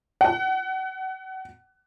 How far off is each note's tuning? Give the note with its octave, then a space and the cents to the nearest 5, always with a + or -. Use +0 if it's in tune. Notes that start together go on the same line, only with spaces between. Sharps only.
F#5 +30